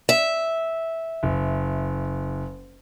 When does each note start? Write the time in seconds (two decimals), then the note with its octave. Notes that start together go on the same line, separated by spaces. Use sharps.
0.09 E5
1.23 F#1